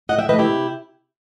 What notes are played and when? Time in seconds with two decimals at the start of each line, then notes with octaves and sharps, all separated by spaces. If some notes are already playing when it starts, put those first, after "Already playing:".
0.09 A2 D#5 F#5
0.19 E5 G5
0.28 E3 B4 D#5
0.32 A3
0.39 E4 G4
0.49 C3